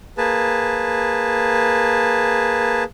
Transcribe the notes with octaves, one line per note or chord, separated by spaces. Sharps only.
A#3 G#4 B4 A5